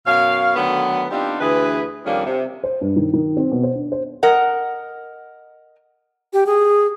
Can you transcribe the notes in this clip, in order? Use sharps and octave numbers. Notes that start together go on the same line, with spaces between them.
F#2 B2 C#5 F5
D3 D#3 F#3 A3 B3
B3 C4 D4 D#4 F4 G4
D2 D3 E3 G#4 B4
F2 D#3 G3 A#3 C#4 D4
C3
C5
G2
D#3
D#3
C4
B2
C5
D4
C5
A#4 D#5 F#5
G4
G#4